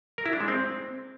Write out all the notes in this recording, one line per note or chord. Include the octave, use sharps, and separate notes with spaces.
A#4
E4
D4
G#3
C4